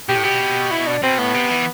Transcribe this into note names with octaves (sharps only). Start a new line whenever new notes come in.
B2 G4
A2
B2 G4
E4
D4
B2 C4
A2 B3
C3
E3